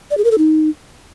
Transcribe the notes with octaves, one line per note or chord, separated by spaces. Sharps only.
D5
G#4
A#4
A4
D#4